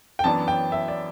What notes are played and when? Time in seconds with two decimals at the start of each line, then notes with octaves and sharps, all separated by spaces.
0.19 G5
0.24 F#2 E3 B3 D4 A5
0.48 G5
0.72 E5
0.88 D5